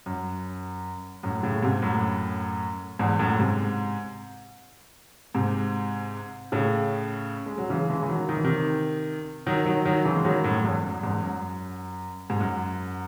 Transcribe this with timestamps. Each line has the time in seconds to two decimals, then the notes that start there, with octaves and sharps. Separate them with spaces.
0.06 F#2
1.23 F#2 A2
1.43 A2 C#3
1.62 G#2 C3
1.82 F#2 A2
2.99 E2 G#2
3.19 F#2 A2
3.39 G#2 C3
5.34 G#2 C3
6.52 A2 C#3
7.46 G#3
7.58 F#3
7.70 C#3 E3
7.90 E3 G#3
8.03 E3
8.09 D#3 F#3
8.29 D#3
8.37 E3
8.44 C3 D#3
9.46 D#3 F#3
9.66 D#3 F#3
9.85 D#3 F#3
10.05 C#3 E3
10.16 G#3
10.25 D#3 F#3
10.44 F#2 A2
10.63 E2 G#2
10.83 F#2
11.03 E2 G#2
11.23 F#2
12.30 G#2
12.40 F#2